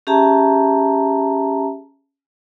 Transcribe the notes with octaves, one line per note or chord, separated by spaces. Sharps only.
C#4 G4 G#4 E5 A5 A#5